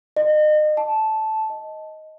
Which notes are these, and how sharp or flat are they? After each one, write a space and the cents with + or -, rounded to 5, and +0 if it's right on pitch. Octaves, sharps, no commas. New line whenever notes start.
D#5 -35
A5 -10
D#5 +10